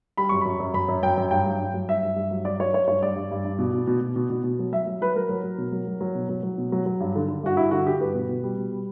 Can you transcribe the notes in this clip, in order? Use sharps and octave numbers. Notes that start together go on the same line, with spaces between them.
G3 B5
F#2 C#6
F#2 B5
F#2
F#2 B5
F#2
F#2 G5
F#2
G2 G5
F#3
G2
F#3
G2 E5
G2
G2
F#3
G2 D5
F#3 C#5
F#3 C#5
G2 C#5
G2 D5
G2
G2
G2
B2
B2
B2
B2
B2
B2
B2
F#3
F#3 E5
F#3
F#3 B4
F#3 A#4
F#3
F#3
B2
F#3
F#3
F#3
B2
F#3
F#3
B2
F#3
F#3
G2
D3
D3
G2 F#4
G2 E4
D3 F#4
D3 G4
G2 B4
B2
B2
G3
B2
G3